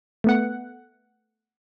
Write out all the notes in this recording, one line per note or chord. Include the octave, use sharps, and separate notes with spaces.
A3 B3 F#5